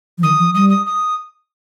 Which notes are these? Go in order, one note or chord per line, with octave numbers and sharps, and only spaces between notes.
F3
D#3 D#6
F3
G3 D#6
D#6
D#6